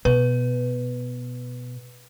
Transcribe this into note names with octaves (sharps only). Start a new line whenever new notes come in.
B2 B4